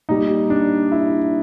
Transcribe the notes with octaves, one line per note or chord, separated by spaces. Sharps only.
A#2 G3 D#4
D4
E4